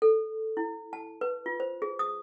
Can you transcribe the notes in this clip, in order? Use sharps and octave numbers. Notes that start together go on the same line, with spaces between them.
A4
E4
A5
B4
F4
C5
G#4
D#6